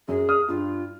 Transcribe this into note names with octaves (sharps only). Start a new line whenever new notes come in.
F#2 G#4
D#6 F6
G2 F4